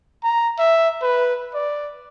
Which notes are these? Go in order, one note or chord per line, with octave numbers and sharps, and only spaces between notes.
A#5
E5
B4
D5